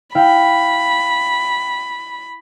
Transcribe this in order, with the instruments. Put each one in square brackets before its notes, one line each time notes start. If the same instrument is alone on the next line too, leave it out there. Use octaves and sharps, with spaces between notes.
[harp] E4 F5 G5 [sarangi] B5